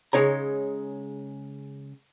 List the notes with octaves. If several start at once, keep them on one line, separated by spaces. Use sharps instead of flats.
C#3 F3 G#3 D#4 C#5 A#5